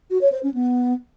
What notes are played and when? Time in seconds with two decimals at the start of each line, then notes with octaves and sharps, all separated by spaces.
0.10 F#4
0.21 C#5
0.32 C5
0.43 C#4
0.54 B3